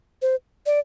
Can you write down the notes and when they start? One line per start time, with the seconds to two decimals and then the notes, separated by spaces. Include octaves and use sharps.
0.22 C5
0.66 D5